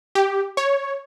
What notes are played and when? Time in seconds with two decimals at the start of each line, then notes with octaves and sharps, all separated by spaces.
0.15 G4
0.57 C#5